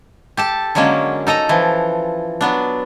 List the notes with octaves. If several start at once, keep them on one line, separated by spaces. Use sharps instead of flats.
G4 A4 A5
D3 F#3 G#3 A#3 C#4
D#4 A4 D#5 A#5
E3 F3
F#3 B3 D4